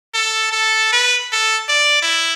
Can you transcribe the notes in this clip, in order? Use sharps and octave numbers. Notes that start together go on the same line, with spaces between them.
A4
A4
B4
A4
D5
E4